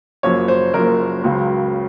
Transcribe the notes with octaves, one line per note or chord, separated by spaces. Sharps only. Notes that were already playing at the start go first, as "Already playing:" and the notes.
F#1 F#2 F3 A#3 C#5
C5
F#1 F#2 F3 A#3 A#4
C#2 C#3 F#3